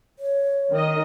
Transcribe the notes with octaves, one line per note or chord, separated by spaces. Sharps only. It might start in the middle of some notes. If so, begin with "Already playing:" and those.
C#5
D#3 D#5